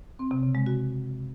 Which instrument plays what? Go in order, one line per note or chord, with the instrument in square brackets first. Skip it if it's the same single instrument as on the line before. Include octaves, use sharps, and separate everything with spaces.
[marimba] C4
C3
C#3
G#3
F#4